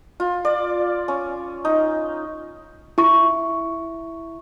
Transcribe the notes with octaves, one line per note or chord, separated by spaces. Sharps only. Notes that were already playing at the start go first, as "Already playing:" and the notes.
F4
D5
C#4
D#4
E4 C#6